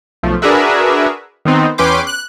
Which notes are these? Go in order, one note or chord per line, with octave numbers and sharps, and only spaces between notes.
B1 F3 A3
D4 F#4 G#4 A#4 B4 E5
D#3 B3 C4 D#4
E2 C#4 B4 G5 C6 D6
F#6